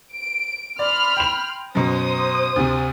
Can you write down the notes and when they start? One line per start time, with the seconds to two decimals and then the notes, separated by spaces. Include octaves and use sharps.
0.12 D7
0.79 D5 B5 C6 F6
1.17 G5 F7
1.75 F#2 B2 C5 D#6
2.56 D2 C3